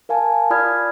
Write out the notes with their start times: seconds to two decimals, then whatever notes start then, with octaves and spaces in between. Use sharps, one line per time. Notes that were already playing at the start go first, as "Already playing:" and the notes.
0.09 A#4 F5 G#5 A5
0.50 F4 D5 B5 D#6 F6 G#6